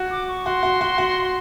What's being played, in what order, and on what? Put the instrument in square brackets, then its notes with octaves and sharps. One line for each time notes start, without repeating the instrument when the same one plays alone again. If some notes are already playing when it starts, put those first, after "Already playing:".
Already playing: [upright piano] F#4
[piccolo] D6
C#6
[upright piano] F#4 [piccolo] C6
[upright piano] F#4
F#4
F#4